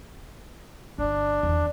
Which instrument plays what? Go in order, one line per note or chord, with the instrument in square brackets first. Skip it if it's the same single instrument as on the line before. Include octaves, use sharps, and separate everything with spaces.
[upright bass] G1 [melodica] D4
[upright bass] E2 D#3